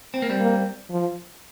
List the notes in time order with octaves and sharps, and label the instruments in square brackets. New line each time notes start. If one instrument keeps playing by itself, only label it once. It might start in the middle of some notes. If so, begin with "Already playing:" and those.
[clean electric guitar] C4
A#3
G3 C4
[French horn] A#3
F3